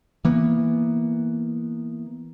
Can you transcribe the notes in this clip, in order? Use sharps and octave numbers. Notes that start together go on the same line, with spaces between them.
E3 A#3 B3